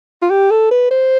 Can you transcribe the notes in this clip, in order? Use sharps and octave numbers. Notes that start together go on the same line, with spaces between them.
F4
G4
A4
B4
C5